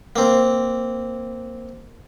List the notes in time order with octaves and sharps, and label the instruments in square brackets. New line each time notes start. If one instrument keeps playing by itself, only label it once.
[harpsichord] A#3 C4